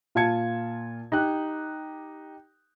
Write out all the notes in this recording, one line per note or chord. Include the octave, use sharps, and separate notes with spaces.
A#2 F4 A5 G#6 C#7
D#4 G4 F#6